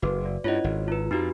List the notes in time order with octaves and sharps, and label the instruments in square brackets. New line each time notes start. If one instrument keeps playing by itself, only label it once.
[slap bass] F#1 [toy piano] F#4 G#4 B4
[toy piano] D5
[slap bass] G2 [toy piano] C#4 E4 F4 [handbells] C#5 D#5
[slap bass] G#1
[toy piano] D#4 [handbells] F4 B4
[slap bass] F2 [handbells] D#4 F#4 G4 [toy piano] A#5 E6